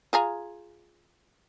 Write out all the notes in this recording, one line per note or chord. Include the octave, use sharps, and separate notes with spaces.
F4 G#4 A#5